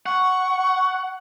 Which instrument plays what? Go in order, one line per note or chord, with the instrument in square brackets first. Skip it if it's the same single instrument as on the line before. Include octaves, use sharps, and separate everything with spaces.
[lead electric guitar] F#5 [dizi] C#6